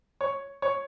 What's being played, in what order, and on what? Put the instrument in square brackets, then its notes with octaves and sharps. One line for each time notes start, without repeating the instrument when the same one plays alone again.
[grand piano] C#5
C#5